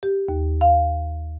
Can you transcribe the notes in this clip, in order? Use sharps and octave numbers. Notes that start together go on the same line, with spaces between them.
G4
D#2
F5